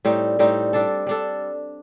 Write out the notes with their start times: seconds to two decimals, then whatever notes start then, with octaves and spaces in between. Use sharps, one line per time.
0.05 A2 G3 C4 D#4
0.39 A2 G3 C4 D#4
0.73 G3 D4 A4
1.07 G3 D4 A4